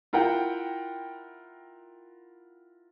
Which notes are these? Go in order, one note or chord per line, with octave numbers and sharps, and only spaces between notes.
E4 F4 A#4 F#5 G5